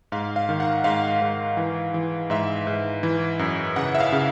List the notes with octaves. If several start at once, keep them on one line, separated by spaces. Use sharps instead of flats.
G#2 F5
F5
D#3
F#5
G#2 F5
G#2
E3
E3
G#2 E5
G#2
E3
F#2
C#3 F#5
E5
F5
C#3